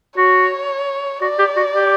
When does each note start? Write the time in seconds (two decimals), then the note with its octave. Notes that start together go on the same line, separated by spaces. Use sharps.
0.17 F#4 C#5
1.22 F#4 D5
1.39 G4
1.56 F#4
1.74 G4